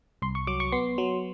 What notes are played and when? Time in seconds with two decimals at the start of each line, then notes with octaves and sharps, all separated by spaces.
0.22 C2 C6
0.35 C#6
0.47 F#3 D6
0.60 C#6
0.72 B3 C6
0.98 F#3